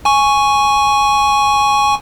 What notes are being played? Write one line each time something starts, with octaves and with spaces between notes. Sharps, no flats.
G#5 C#6